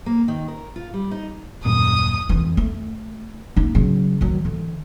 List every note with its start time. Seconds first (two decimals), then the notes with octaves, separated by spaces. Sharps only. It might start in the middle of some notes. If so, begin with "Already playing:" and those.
0.06 A#3
0.28 D#3
0.48 A#4
0.76 F4
0.93 G3
1.11 D#4
1.65 D#1 F#2 A#2 D#6
2.29 F2 E3
2.57 A3
3.56 A#3 D#4
3.75 C#3 F#3
4.21 D#3 F#3
4.45 D3 E3